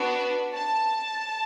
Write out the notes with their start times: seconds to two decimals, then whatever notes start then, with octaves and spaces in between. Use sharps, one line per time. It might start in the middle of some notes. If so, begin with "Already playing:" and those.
Already playing: B3 D4 F#4
0.54 A5